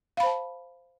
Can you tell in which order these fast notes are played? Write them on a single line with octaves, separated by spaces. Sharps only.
F5 B5 C5 A5